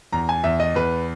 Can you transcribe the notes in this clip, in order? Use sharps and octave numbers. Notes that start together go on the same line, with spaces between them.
E2 A#5
G#5
E2 E5
D#5
E2 B4